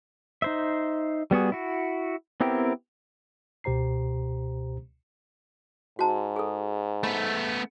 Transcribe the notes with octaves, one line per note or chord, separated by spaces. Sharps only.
D#4 C5 E5
G3 B3 F#4 G#4
E4 F#4
B3 C4 E4 G4 A#4
C#2 B2 G4 C5 A#5 C7
G#2 F#4 A5
G#4 A4
A3 B3 B5